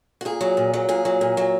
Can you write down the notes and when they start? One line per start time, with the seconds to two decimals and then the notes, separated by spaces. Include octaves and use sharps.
0.21 F#4
0.25 A#2 G#4
0.41 F#3
0.57 A#2
0.74 F#3
0.89 A#2 G#4
1.05 F#3
1.21 A#2
1.37 F#3